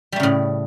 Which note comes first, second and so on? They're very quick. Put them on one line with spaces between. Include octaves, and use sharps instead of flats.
G3 A3 C#3 A2